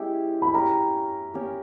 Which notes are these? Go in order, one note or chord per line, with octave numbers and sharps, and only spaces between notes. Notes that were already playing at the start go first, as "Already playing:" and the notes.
Already playing: G#3 C#4 E4 G4
B5
C#4 G4 A#4 A#5
C#4 G4 A#4